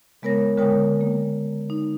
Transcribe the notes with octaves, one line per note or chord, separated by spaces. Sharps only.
C#3 G#3 B3 A#4 C#5 A#6
D3 G#3 A#4 C#5 G5 D#6
A#3
D#4